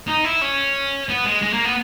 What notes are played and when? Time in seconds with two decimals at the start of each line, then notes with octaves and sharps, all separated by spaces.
0.08 D#4
0.24 E4
0.41 C#4
1.09 B3
1.25 G#3
1.42 G#3
1.53 A#3
1.65 B3